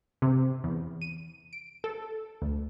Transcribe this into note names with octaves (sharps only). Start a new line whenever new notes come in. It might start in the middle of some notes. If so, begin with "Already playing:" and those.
C3
E2
D#7
D7
A4
D2